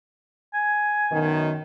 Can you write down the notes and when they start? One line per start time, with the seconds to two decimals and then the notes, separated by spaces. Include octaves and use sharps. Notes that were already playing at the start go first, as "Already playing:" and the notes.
0.54 G#5
1.12 F#2 B2 D#3